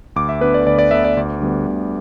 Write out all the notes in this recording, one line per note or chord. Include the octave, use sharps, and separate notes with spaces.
D2 D6
E5
D3 B3 B4
D5
D2 D5
D5
D3 B3 E5
D5
D2
D3 G3 B3
D2